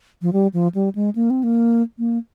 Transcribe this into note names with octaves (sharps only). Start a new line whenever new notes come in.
F3
G3
F3
G3
G#3
A#3
C4
A#3
A#3